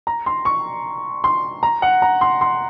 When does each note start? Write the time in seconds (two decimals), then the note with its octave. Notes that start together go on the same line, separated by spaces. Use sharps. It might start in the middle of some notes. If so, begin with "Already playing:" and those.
0.07 A#5
0.26 C6
0.45 C#6
1.24 C6
1.63 A#5
1.82 F#5
2.02 A#5
2.21 C6
2.41 C6